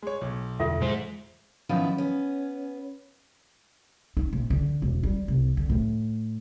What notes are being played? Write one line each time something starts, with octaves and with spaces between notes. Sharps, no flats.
G#3 C#5
B1
E2 D3 G3 F4 A4 E5
G#2 E3 F3 G#3 C5
D#3 F3 B3 C#4 D#4 E4
B3 C#4
D#4
A#1
D3
E1
G3
C2
D3
A2